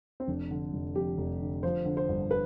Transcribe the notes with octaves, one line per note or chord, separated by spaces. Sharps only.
C4
F1 D4
D3
F1
F2 G4
F1
D3
F3 C5
D3
C5
G1
B4